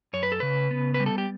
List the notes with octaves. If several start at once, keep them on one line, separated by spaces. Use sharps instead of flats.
F#2 C#5
B4
A4
C#3 B4
B3
B4
G3
A4
G4